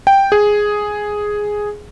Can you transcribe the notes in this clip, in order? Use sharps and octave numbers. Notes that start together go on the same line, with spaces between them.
G5
G#4